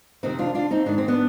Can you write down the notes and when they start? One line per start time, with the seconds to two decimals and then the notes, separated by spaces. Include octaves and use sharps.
0.23 F2 C3 D#3 C4 D#4
0.39 D4 F4
0.55 D4 F4
0.71 C4 D#4
0.86 G#2 D#3 D4
0.98 C4
1.08 B3 D4